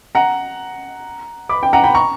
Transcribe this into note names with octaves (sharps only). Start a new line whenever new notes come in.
F#5 A#5
B5 D6
G5
F#5 A#5
G5 B5
A#5 C#6